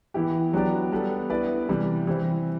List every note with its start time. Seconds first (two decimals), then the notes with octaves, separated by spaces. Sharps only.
0.14 E3 B3 E4 G4
0.53 F#3 B3 D4 G4 D5
0.92 G3 B3 D4 A4
1.30 B3 E4 B4 D5
1.69 C3 E3 G3
2.07 E3 G3 C4 E4